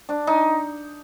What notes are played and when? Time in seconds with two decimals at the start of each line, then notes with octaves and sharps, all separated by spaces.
0.09 D4
0.27 D#4